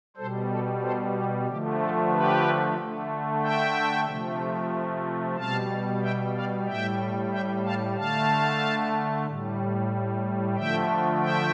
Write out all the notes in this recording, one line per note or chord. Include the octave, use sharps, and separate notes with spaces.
B2 G3 A4 C5
A4
A4 C5
G4
D3 F3 A3 G4
A4
G4 B4
D3 A3
E5 G5
C3 F3 A3
B2 G3 F5 A5
E5 G5
D5 F5
A2 G3 E5 G5
E5 G5
F5 A5
D3 A3 F5 A5
A2 G3
D3 F3 A3 E5 G5
E5 G5